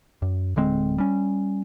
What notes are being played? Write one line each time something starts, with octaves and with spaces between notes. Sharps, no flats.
F#2
D1 D3 G#3 C4
G3 C#4